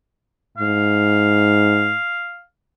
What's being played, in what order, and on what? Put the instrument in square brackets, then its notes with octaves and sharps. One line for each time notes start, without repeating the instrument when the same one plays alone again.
[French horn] G#2 [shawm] F5